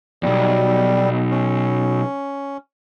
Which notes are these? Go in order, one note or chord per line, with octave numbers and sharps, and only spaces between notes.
B1 E2 G3
C#4